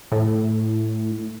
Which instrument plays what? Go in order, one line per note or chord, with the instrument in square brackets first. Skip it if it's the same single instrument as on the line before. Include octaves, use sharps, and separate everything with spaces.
[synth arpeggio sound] A2